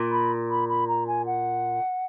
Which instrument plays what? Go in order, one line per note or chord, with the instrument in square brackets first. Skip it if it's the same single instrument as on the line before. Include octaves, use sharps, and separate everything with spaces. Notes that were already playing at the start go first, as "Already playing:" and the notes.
Already playing: [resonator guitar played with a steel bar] A#2
[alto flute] B5
B5
B5
A#5
G#5
F#5